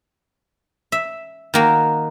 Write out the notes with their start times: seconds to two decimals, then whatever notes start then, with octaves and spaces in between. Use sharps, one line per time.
0.92 E5
1.54 D#3 A#3 F#4